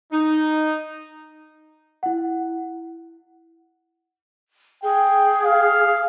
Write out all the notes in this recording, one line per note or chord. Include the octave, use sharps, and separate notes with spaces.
D#4
E4 F#5
G#4 G5
F5